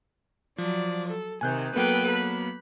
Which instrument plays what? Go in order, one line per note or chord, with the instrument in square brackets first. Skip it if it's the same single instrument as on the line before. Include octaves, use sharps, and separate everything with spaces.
[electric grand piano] F3 [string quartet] F#3 D5
[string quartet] A4
[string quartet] C3 D#3 [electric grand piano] G#5 F#6 G6
[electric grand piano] F#3 A#3 B3 [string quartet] A4 B4 G5
[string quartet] B5